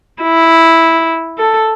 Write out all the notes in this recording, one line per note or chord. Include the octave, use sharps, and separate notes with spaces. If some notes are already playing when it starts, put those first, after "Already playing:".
E4
A4